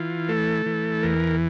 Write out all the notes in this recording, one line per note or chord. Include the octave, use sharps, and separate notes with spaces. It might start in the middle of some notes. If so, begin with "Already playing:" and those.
Already playing: E3 F4
A3 A4
E3
E2 A#4